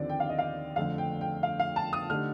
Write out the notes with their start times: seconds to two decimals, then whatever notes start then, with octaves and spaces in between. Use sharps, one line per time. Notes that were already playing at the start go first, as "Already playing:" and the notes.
Already playing: D#2 D3 F3 C4 D5
0.09 G5
0.20 F5
0.29 D#5
0.38 F5
0.76 F2 D3 A3 F5
0.98 G5
1.21 G5
1.43 F5
1.59 F5
1.76 A5
1.93 D#6
2.10 D3 A3 D#4 G4 F6